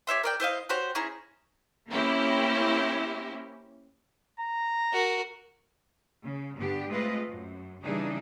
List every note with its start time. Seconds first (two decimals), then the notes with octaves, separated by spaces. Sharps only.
0.07 G4 C#5 E5 C6
0.23 A#4 D5 G5
0.40 E4 C5 D#5 F5
0.69 F#4 G4 C5 C#5
0.95 C#4 E4 G#4 A#5
1.91 A#3 C4 C#4 E4 G4
4.40 A#5
4.93 F#4 A#4
6.24 C#3
6.57 G2 D3 B3 D4 G4
6.89 G#3 A3 C4 F4 B4 D#5
7.29 F#2
7.84 C#3 E3 G3 D4 D#4 G#4